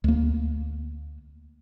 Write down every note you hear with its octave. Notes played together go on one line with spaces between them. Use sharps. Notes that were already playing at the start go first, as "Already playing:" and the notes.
D2 A#3